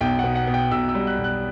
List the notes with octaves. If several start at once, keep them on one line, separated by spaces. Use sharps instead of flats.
B1 G5
B2 F#5
F#5
B2
G5
B1 E6
E6
G3
F#6
B1
F#6